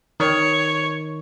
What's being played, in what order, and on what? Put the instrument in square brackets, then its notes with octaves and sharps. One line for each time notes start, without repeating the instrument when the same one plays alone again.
[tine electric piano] D#3 C#6 [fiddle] C#5